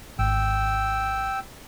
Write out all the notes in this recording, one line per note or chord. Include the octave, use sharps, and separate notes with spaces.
G#1 G5 E6